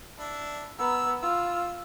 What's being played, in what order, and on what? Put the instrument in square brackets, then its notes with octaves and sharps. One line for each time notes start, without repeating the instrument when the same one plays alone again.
[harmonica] D4 E4
[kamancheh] B3 [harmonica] A#4 E6
[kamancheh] F4 [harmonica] E6